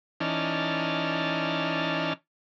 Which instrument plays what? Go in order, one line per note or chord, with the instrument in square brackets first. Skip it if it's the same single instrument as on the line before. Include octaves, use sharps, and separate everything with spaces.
[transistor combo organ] E3 C#4 D#4 D5 A5 F6